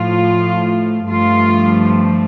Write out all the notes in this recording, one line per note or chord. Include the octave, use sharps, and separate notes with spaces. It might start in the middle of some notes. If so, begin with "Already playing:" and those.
Already playing: A2 F3 A3 F4
G2 F3 A3 F4